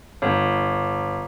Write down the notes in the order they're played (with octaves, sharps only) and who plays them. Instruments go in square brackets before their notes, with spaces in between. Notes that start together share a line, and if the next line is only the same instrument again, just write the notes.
[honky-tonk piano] G1